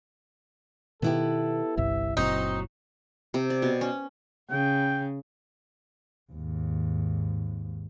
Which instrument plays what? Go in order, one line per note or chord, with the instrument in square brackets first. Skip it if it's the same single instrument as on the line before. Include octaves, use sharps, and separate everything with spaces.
[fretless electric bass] B2 D#3 [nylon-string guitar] B3 E4 G4 [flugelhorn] A4
[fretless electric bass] G1 C2 G2 [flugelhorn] E5
[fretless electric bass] F#1 A#2 [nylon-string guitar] F#3 [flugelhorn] C4 [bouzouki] D#4
[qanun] C3
D5
B2
C#4
[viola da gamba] C#3 [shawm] G5
[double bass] D#2 G#2